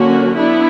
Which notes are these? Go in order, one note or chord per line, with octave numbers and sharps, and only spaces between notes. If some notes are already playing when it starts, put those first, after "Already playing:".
Already playing: D3 F#3 A#3 C#4 F#4
B3 D4 E4